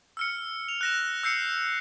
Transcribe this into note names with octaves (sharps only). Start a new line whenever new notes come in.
E6 F6 C#7
F7
F#6 A#6 E7
E6 G6 C7 C#7